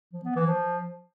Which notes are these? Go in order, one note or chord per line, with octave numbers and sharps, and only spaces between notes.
F3
B3
E3
F3